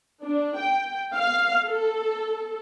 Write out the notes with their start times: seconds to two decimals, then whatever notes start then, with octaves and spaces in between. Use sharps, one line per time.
0.23 D4
0.58 G5
1.15 F5
1.66 A4